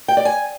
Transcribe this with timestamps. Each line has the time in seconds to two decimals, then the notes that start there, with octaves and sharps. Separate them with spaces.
0.08 G5
0.17 D5
0.25 G#5